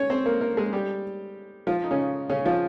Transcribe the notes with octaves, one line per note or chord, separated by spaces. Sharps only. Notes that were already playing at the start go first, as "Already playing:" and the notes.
Already playing: C#4 C#5
C4 C5
A#3 A#4
A#3 A#4
G#3 G#4
G3 G4
F3 F4
D#4
C#3 C#4
C#3 C#4
F3 F4